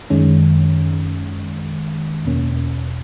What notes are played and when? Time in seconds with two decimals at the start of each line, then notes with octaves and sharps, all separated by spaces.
0.10 F#2 D#3 G#3 C#4
2.25 E2 B2 A#3 C#4